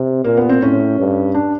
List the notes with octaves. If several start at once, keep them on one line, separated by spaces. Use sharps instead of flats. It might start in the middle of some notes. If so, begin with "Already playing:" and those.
Already playing: C3
A#2 A#3
B3
C4
A2 C#4
G2
D4